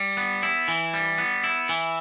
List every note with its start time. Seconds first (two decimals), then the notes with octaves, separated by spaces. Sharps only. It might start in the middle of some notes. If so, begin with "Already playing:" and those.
Already playing: G3
0.17 B3
0.43 E4
0.68 E3
0.94 G3
1.18 B3
1.44 E4
1.69 E3